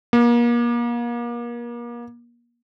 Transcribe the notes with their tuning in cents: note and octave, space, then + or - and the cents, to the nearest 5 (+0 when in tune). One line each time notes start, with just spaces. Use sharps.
A#3 +35